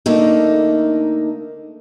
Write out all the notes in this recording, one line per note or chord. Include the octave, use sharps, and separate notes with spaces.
D3 A3 A#3 D#4